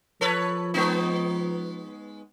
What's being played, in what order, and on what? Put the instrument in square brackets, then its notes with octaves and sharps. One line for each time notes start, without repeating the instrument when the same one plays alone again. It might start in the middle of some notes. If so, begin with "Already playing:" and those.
[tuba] F3 [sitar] A4 B4 C#5
[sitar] G#3 B3 D#4